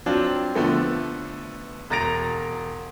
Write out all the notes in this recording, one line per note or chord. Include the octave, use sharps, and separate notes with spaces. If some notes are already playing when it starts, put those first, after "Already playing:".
F#3 C4 D4 F4 C5
D3 F3 A3 B3
E1 A#5 A6 A#6 D7 F7